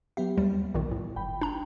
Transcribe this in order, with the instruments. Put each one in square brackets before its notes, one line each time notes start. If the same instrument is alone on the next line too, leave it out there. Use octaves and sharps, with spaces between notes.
[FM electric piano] F#3 B3 G4 [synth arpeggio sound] E5
[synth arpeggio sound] D#2 G3
B1 A#2 D#3
A2
[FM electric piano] G1 G5 B5
[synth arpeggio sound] D4 A#5